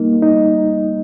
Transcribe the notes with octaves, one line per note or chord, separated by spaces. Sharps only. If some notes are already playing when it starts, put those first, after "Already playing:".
Already playing: G3 A#3 D#4
D#4